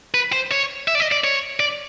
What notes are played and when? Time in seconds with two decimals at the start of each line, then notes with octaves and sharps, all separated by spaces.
0.14 B4
0.32 C5
0.51 C#5
0.88 E5
0.95 D5
1.00 D#5
1.12 D5
1.24 C#5
1.60 D5